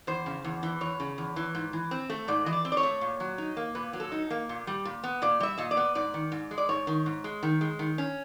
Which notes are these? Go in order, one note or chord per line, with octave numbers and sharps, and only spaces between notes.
E2 C5
C#3
E2
E3
E2 C#5
C#3
E2
E3
G#2
E3
C4
A3
G#2 D5
E3 D#5
D5
C4
D5
C#5
A3
A#2
F#3
D#4
A#3
A#2 B4
F#3
A4
D#4
A#3
A#2
G3
A#2
B3
A#2 D5
G3 E5
A#2 D#5
D5
B3
G#2 D5
D#3
G#2
G#3
D5
G#2 C#5
D#3
G#2
G#3
D#3
G#3
D#3
C#4